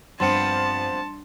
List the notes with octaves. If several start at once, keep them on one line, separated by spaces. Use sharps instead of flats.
G2 F3 B3 C4 A5 C6 C#7